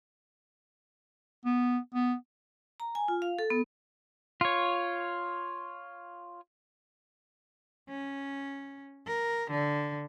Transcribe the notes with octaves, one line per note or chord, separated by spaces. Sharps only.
B3
B3
A#5
G#5
F4
F5
A4
B3
F4 C#5
C#4
A#4
D3